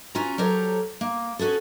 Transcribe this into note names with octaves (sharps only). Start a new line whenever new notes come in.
C#4 F4 F#4 G#5 A#5
F#3 G4 A4 A#4 C5 C#5
A#3
C#4 F#4 G#4 A4